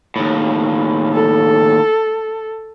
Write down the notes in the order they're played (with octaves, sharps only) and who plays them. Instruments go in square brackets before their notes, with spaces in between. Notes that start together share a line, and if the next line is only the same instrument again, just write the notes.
[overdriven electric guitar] D#2 A2
[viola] A4